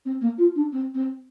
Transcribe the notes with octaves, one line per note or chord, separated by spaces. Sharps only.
C4
A#3
F4
D4
C4
C4